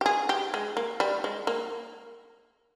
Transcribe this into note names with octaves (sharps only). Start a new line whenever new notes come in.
G4
G#4
G4
G#3
A#3
G3
G#3
A#3